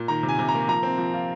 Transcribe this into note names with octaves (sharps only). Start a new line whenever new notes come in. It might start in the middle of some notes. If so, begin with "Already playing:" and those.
Already playing: A#2
D#3 A#5
C3
G#5
C3
A#5
A#3
F3 A#5
C4
F3
F4